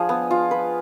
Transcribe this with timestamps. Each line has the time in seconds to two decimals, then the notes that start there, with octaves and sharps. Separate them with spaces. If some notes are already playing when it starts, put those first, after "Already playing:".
Already playing: F3 G#3 D4 G#4
0.09 B3
0.31 F4
0.51 B4